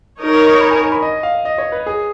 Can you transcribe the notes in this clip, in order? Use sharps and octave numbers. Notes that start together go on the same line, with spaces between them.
D#4 A#4 C#5
D#6
C#6
B5
G#5
G#5
B5
D#5
F5
D#5
C#5
B4
G#4